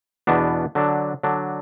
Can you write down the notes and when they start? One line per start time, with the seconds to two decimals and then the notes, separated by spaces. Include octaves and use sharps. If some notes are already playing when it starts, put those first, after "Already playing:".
0.27 E2 B2 B3 D4
0.75 D3 F#3 D4
1.23 D3 F#3 D4